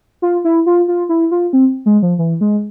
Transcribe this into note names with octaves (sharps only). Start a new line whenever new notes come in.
F4
E4
F4
F4
E4
F4
C4
G#3
F3
E3
G#3